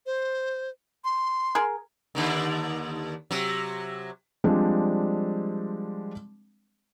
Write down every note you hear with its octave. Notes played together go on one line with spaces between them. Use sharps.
C5
C6
G#4 A#4
D#2 D3 D#3
C3 F#3
F3 G3 G#3 C4 D4